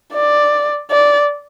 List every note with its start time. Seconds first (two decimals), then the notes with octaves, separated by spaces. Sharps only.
0.13 D5
0.91 D5